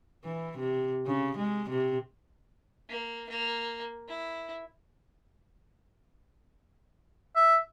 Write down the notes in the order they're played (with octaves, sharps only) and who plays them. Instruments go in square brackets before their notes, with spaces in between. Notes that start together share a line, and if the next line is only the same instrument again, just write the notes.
[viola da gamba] E3
C3
C#3
G#3
C3
[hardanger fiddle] A#3
A#3
E4
[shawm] E5